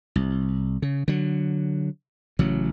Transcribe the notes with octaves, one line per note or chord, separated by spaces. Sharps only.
C2
C#3
D3 F#3
A1 C#3 F#3